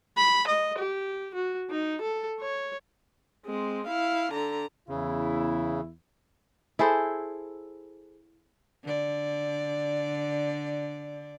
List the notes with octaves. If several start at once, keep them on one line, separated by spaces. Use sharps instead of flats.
B5
D#5
G4
F#4
D#4
A4
C#5
G#3 C4
E4 F5
D3 A#5
E2 C#3 E4
E4 G#4 A4 C5
D3 D5